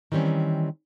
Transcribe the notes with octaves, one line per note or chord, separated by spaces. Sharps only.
D#3 E3 G3 C4 C#4